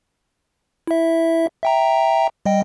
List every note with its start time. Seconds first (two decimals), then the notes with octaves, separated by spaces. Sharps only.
0.87 E4 E5
1.63 E5 G5 A#5
2.46 G3 D#5 G5